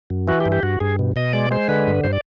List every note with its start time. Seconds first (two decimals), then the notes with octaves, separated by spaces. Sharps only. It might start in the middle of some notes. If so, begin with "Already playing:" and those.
0.10 F#2
0.28 E3 F#4
0.40 G4
0.46 G2
0.52 G4
0.63 G2 F#4
0.80 G2 G#4
0.99 B2
1.16 B2 D#5
1.33 G#3 D5
1.51 G#3 C5
1.68 D3 B4
1.87 G2
2.03 G2 C5
2.13 D5